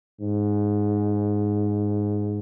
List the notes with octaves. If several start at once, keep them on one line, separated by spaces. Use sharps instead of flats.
G#2